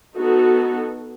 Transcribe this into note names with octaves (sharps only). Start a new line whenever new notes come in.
B3 D#4 F#4 A4